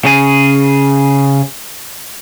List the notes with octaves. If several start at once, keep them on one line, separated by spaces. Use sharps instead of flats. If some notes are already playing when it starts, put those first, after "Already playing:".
C#3 G#4